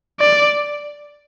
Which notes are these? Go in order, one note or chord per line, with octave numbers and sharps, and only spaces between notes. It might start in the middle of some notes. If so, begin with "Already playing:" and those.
D5